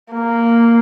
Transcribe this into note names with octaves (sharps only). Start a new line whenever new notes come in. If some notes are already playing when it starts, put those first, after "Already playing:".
A#3